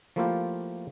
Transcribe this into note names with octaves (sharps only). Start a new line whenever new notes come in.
F3 A3 A#3 E4 F4 G4